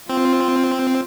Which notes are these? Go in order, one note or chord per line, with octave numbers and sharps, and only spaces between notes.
C4 F4